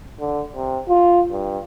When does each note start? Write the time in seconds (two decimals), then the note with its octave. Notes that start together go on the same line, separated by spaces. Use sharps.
0.20 D3
0.56 C3
0.89 F4
1.31 G2